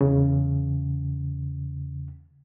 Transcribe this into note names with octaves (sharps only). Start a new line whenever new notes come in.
E2 C#3